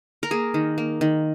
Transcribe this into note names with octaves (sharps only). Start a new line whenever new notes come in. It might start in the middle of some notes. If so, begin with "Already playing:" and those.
A#4
A#3 G#4
D#3
A#3
D#3